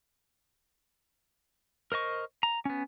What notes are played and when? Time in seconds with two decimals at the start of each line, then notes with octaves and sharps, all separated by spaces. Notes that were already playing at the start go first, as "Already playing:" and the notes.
1.92 A#4 C5 D#5 C#6
2.43 A#5
2.65 B3 C#4